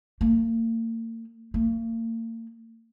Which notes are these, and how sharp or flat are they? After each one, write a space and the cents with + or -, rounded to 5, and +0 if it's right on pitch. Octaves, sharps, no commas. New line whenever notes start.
A#3 -40
A#3 -40